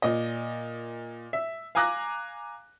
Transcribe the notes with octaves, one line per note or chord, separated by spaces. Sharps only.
A#2 D#5
E5
F5 G#5 A#5 D6 F#6 A#6